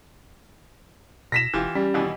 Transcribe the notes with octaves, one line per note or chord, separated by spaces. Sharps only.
B2 A#6 B6 E7
E1 E3 F4 G4
G3 C#4
D#2 B2 E3